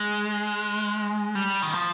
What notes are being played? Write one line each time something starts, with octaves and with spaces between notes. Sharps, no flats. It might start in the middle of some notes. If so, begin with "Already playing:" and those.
Already playing: G#3
G3
D#3
F3